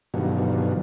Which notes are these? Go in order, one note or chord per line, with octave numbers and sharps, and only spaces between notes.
G2 B2 D3 D#3 F3 F#3